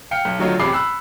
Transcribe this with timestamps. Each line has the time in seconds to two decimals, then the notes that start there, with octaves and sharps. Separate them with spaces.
0.11 F5 G5 F6 C#7
0.25 B1
0.39 D3 D#3 F#3 A3 D#4 F4
0.60 A1 C3 G#4 B5 D6 C7
0.72 B5 E6 F#6 C7